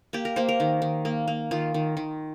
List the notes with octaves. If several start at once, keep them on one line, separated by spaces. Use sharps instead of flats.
A#3 G4
A#4
A#3 C5
A#4
D#3
D#3
A#3
A#3
D#3 F4
D#3
D#3